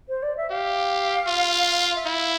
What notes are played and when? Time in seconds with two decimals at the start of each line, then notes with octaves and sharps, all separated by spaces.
0.08 C5
0.22 D5
0.36 E5
0.50 G4 F5
1.27 F4
1.95 E5
2.05 E4 F5